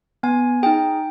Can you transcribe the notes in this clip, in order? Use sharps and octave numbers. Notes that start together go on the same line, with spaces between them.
B3 G#5
D#4 G#4 G5